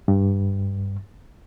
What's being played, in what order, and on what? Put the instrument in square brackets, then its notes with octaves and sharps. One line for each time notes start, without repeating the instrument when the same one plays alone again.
[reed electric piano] G2